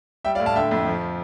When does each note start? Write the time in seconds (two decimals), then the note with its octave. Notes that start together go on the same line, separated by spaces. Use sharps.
0.24 G3 E5 G5
0.35 D5 F5
0.40 A2
0.46 F5 A5
0.56 D3 E5 G5
0.71 F2
0.87 F3